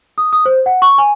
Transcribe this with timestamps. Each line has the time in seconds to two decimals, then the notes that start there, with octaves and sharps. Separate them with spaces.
0.18 D#6
0.33 D#6
0.46 C5
0.66 F#5
0.82 C#6
0.98 G#5